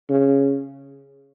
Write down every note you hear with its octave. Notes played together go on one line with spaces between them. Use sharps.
C#3